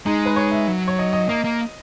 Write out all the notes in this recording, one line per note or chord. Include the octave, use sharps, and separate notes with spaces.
G#3 D#4
B4
C#5
E5
F#3
C#5
D#5
D#5
A#3 D#5
A#3